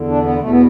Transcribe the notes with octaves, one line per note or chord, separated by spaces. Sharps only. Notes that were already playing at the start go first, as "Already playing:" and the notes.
Already playing: E2 D3
D4
B3
E2 B2 A3
B3